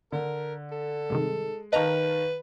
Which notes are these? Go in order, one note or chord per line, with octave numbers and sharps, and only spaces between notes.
D3 A#4
A4
G2 C3 D#3 G#3
D#3 B4 D#5 F5 A5 A#5